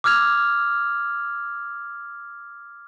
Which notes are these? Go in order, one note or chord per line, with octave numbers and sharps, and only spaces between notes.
D6 E6 F6 G#6 F7